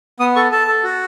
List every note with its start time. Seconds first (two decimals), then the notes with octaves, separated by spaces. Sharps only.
0.20 B3 D#6
0.36 A4 C#6
0.52 A4 A5
0.67 A4
0.84 F#4